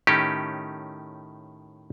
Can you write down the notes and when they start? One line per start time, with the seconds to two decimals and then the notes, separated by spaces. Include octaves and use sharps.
0.07 A2 D#3 A3 C#4 D#4 G4